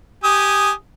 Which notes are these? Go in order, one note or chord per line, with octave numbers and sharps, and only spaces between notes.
G4 G#5 D#6